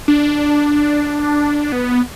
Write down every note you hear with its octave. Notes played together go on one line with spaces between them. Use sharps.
D4
B3